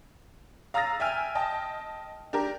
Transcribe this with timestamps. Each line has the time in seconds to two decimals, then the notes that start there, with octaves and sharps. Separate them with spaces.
0.74 F5 A#5 D#6 E6 A6 A#6
1.00 E5 G5 G#5 F6
1.35 D#5 G5 A5
2.33 D4 G4 A#4